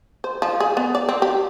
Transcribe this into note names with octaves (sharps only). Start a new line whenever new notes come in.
C5
F3
G#4
B3
D5
C4
G4